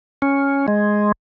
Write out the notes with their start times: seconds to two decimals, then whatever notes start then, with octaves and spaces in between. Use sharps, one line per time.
0.22 C#4
0.68 G#3